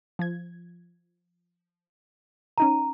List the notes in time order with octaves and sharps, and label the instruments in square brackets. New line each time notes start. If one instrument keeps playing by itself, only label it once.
[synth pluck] F3 G#6
[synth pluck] C#4 D#4 D#7 [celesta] A#5